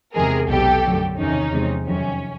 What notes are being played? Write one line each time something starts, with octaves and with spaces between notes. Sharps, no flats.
E2 C3 D#3 G#3 G#4 A#4
B1 B2 G3 G4 A4
F#2 D3 F#3 A3
E2 C3 D#3 C#4 D#4
E2 C3 F3 G#3
F2 C3 D#3 F#3 C#4